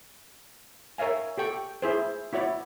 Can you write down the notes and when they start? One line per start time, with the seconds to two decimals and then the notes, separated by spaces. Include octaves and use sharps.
0.98 A#4 C#5 E5 F5 G#5
1.38 G4 A4 G5 C#6
1.82 E4 G#4 C5
2.33 E4 F#4 C#5 D5